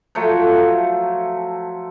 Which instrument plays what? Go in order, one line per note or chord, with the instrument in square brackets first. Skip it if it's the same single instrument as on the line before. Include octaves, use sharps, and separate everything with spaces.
[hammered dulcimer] F3 F#3 A3